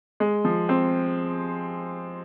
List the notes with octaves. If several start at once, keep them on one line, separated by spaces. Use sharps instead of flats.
G#3
F3
C4